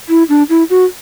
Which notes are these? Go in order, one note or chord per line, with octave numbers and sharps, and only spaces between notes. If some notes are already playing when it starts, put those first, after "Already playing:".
E4
D4
E4
F#4